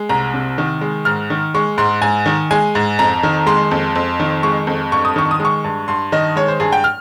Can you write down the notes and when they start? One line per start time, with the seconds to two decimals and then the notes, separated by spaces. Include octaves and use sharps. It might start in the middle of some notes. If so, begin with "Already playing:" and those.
Already playing: G#3
0.09 C2 A#5
0.34 C3
0.58 D#3
0.81 G#3
1.05 G#2 F6
1.30 D#3
1.55 G#3 C#6
1.78 G#2 C6
2.02 G#2 G#5
2.26 D#3
2.51 G#3 G#5
2.75 G#2
2.99 F2 A#5
3.23 D#3
3.46 G#3 C6
3.71 F2
3.95 F2
4.20 D#3
4.43 G#3 C#6
4.67 F2
4.92 G2 C#6
5.05 D#6
5.16 D#3 C#6
5.31 D#6
5.40 G#3
5.45 C#6
5.64 G2
5.88 G2 C6
6.12 D#3 D#5
6.36 G#3 C#5
6.48 C5
6.60 G2 G#4
6.72 G5
6.84 F6